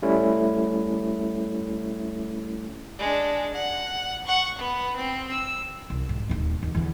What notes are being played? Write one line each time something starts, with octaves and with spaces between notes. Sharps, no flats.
G3 A3 C#4 E4
G#3 D4
F#5
F#5 C#6
B3
C4
E6
C2
G#2
D1 D#2
D#2
E2 D3